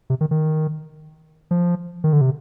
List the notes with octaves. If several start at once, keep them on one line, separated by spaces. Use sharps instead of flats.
C3
D#3
D#3
F3
D#3
D3
C3